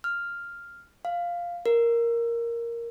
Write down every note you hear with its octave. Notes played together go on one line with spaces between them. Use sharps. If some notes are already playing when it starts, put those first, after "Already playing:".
F6
F5
A#4